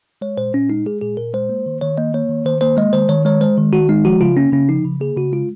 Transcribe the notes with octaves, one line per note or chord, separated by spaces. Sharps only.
G#3 C#5
A#2 C5
A#2 C#4
G#3 D#4
G#3 G#4
A#2 G#4
A#2 A#4
G#3 C5
A#3
D#3
D#3 C#5
A#3 D#5
A#3 C#5
D#3
D#3 C5
A#3 C5
G#3 D#5
D#3 C5
D#3 C#5
G#3 C#5
G#3 C5
D#3
D#3 F#4
G#3 D#4
F3 F#4
C#3 F4
A#3 C#4
C#3 C#4
F3 D#4
C#3
A#3 G#4
C#3 F#4
G#3 F4